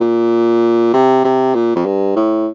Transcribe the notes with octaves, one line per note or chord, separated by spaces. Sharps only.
A#2
C3
C3
A#2
F2
G2
A2